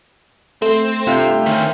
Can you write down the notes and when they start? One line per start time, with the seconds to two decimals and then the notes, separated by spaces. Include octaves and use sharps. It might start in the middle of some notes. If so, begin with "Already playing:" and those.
0.62 A3 C4
1.07 G2 C3 F4 E5 G5
1.46 D#3 C4 C#4